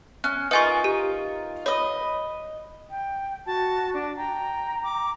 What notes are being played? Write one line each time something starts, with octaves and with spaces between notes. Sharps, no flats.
C#4 F#6
D#4 F4 A#4 B4 G#5 C#6
G4
B4 C#5 D#5
G5
F#4 A5
D4
G5 A#5
D6